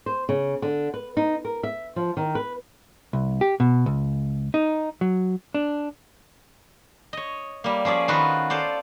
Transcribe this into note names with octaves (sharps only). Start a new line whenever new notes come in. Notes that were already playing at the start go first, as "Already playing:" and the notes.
C5
C#3
D3
B4
D#4
A#4
E5
F3
D#3
B4
C2
G4
B2
C#2
D#4
F#3
D4
C#5 D#5
G3 A#3
F3 C#4 G#4 D5
D#3 B3 F4 F#4 B4
F4 A4 C5 D5